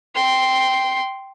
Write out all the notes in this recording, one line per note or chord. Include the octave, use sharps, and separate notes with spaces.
G5 C6